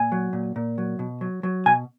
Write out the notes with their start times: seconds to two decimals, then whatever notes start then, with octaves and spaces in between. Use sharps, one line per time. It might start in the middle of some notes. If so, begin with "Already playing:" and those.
Already playing: A#2 G#5
0.12 F#3
0.33 A#2
0.56 A#2
0.78 F#3
0.99 B2
1.21 F#3
1.43 F#3
1.66 B2 G#5